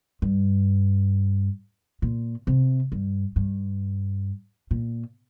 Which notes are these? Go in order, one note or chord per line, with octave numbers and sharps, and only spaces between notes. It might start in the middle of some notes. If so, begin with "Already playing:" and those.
G2
A#2
C3
G2
G2
A#2